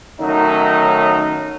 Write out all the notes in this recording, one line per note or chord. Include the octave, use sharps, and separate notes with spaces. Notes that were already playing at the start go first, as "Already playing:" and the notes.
D#3 F#3 A3 C#4 D#4